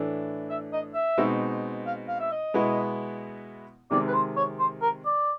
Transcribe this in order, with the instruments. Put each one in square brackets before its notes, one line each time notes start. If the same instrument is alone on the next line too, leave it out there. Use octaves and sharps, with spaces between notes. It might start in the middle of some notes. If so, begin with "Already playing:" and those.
Already playing: [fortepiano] A2 E3 A3 D4
[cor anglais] E5
D#5
E5
[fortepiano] B2 G#3 C4 D#4
[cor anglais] F5
F5
E5
D#5
[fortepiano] B2 G#3 B3 E4
[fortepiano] C3 D#3 G#3 C4 [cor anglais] D5
[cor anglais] B4
C5
C#5
C5
A#4
D5